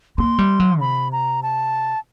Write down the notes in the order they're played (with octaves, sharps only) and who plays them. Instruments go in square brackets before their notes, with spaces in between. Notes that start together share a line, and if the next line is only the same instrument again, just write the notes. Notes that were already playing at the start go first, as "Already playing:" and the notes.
[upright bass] A#3 [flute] C6
[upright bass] G3
F#3
[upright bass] C3 [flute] B5
[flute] A#5
A5